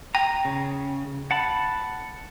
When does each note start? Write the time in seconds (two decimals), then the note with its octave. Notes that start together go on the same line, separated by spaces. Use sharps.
0.15 G5 A#5
0.45 C#3
1.31 F#5 A5 B5